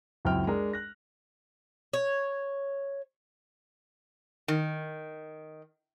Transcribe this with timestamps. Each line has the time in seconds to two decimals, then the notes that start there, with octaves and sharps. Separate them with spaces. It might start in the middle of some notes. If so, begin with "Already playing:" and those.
0.25 C#2 F#2 C4 E4 G5 F6
0.47 G#3 D4 A#4
0.73 F#6 A#6
1.93 C#5
4.48 D#3